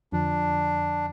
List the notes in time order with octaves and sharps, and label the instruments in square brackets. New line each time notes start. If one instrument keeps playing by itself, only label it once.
[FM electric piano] F2 D3 F3 [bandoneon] D4